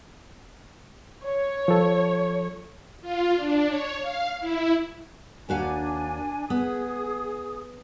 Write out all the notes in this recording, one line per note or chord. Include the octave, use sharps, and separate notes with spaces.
C#5
F3 A4
F4
D4
C#5
F5
E4
D#2 D4 F#4 F5 G#5
B3 G#4 D#6